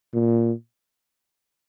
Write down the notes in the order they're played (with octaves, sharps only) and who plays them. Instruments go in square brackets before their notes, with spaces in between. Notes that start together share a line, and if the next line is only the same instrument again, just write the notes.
[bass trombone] A#2